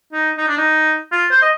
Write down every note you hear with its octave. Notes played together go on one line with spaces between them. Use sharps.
D#4
D#4
D4
D#4
F4
C5
D#5